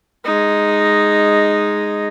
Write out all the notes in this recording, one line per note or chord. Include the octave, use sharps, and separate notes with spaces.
G#3 D#4